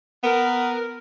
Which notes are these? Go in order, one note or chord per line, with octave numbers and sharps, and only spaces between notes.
B3 A#4